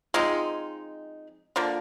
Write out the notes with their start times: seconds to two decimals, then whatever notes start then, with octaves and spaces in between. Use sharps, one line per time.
0.14 F3 G#3 C4 D#4
1.56 D3 F3 A#3